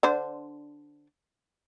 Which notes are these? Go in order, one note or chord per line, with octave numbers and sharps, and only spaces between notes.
D3 D4 C5